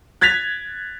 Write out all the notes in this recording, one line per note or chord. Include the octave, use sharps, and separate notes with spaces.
F#6 G#6 A6 B6 F7